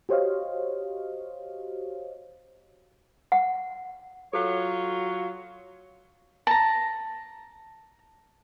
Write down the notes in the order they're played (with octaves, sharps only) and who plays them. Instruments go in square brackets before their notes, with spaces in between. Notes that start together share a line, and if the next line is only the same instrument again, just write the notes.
[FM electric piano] F#4 G4 C5 C#5 D#5 F5
[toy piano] F#5
[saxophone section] F#3 F4 C#5 [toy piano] A4
[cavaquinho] A5 A#5